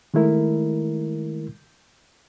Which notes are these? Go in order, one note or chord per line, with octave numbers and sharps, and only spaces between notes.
D#3 G#3 A3 E4 A#4